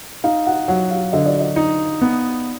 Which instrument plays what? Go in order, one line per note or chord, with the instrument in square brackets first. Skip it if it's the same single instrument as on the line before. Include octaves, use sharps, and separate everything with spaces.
[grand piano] D#4 [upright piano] F5
[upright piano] F#5
[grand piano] F#3 [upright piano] F#5
[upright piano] F5
[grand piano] D3 [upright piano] D#5
[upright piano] D5
D#5
[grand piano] D#4
B3